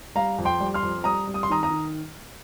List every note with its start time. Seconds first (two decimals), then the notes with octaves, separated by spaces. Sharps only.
0.15 G3 F5 A#5
0.38 F2
0.45 G5 C6
0.60 G3
0.74 C6 F6
0.83 F2
1.04 G3 A#5 D#6
1.27 G3
1.34 D#6
1.43 C6
1.49 D#3 A#5 D#6
1.63 A#5 D#6
1.70 D#3